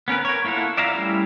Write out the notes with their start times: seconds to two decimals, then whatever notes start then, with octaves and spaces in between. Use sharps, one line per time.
0.08 B3 C#4 A#4 B4
0.25 A#4 C#5
0.44 A#3 E4 F4 A4 F#5
0.77 D5 E5 F5 A#5
0.93 G3 A3 C#4 E4